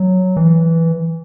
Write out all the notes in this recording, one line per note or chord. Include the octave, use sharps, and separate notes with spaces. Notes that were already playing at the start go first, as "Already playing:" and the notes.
Already playing: F#3
E3